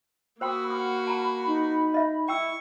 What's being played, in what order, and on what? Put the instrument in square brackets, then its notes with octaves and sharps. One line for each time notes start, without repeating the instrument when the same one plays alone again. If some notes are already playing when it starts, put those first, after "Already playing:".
[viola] A#3 F#4 [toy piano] C5 G5 C6 [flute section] B5 D#6 E6
[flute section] F#5 F6 [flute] B5 [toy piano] D#6
[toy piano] A5 A#5
[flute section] D#4
[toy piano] D#5 E5
[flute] E4 [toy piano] G5 E6 [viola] C#6